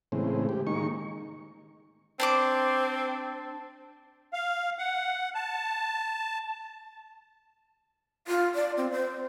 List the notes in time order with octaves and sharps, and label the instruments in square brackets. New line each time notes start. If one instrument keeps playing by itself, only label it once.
[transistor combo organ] A2 C#3 E3 G#3 C4
G4
D#3 G#3 A#3 D#4 C#6
[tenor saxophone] C4 [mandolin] D4 C5 D6
[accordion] F5
F#5
A5
[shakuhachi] F4
D5
C4
C5